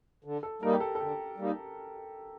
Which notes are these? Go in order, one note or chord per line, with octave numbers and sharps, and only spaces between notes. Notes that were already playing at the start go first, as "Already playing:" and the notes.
D3
A4
G3 A#3 D#4 A#4
G4
A4
A4
D3 G4
G3 A#3 D#4